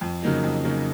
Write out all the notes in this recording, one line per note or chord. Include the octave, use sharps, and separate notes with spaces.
F2
C#3 F#3 A#3 D#4
F2
C#3 F#3 A#3 D#4